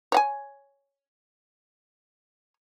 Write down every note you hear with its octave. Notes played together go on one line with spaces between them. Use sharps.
C#5 F#5 G#5